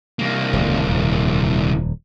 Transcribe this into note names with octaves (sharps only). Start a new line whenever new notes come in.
C2 A#3
D#1 C#2 C3
D#1 F2